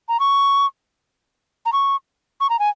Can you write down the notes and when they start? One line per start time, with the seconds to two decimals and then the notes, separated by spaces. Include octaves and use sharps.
0.08 A#5
0.20 C#6
1.66 A#5
1.73 C#6
2.40 C#6
2.49 A#5
2.59 G#5